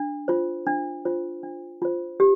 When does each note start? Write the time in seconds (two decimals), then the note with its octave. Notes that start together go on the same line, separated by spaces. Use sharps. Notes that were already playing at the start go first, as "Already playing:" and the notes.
Already playing: D4
0.28 F4 C5
0.67 D4
1.05 F4 C5
1.43 D4
1.82 F4 C5
2.20 G4